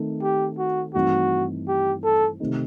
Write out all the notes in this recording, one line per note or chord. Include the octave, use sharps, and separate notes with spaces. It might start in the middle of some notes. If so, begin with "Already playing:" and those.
Already playing: D#3 A3 C4
G4
F#4
G2 E3 A3 C4 D#4 F#4
G4
A4
C3 D#3 A3 D#4